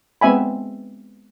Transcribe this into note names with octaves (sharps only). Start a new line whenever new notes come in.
G#3 B3 C4 E5 G#5 B5